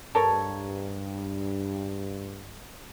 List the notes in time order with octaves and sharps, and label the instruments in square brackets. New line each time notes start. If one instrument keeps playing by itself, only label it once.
[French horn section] G2 [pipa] A4 A#4 C#5